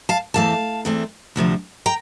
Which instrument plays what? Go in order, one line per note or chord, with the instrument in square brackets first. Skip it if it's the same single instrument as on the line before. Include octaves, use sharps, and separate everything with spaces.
[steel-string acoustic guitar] F5 A5
E2 E3 A3 C4 F5 A5
E2 E3 A3 C4
D2 C3 F3 C4
G5 A#5